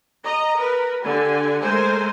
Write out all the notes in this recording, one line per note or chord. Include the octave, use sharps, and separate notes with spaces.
D#5 A#5
A#4 B4
D3 G4 G#5
G#3 A3 A#4 C5 G#5